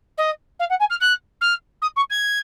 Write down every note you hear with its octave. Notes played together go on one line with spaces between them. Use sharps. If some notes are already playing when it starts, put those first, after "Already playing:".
D#5
F5
F#5
G#5
F6
F#6
F6
D#6
C#6
G#6